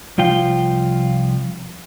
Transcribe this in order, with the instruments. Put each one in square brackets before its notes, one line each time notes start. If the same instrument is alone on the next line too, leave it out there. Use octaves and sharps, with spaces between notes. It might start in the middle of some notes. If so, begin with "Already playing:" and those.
[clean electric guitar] C2 F3 F4 G5